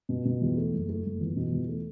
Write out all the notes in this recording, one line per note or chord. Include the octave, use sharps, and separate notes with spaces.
B2
B2
E2
A3
F#1
A3
F#1
E2
B2
E2
A3